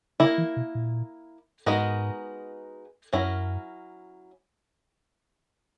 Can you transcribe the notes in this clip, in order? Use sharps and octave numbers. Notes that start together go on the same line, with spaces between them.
C#3 A#3 E4 A#4
E3
B2
A#2
G#2 G#3 B3 D#4 F#4 A#4
F#2 F#3 C#4 E4 A#4